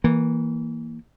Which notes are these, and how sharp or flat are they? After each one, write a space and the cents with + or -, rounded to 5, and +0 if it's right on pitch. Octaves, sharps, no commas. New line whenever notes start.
E3 -15 A#3 +0